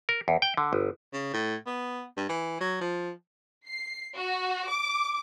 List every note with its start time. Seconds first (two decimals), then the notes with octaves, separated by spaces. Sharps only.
0.09 A#4
0.28 E2
0.42 G5
0.57 D3
0.73 G1
1.13 C#3
1.33 A2
1.66 B3
2.17 G2
2.29 E3
2.60 F#3
2.81 F3
3.66 C7
4.16 F#4
4.68 D6